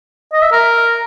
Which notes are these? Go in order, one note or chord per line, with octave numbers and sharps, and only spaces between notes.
D#5
E5
A#4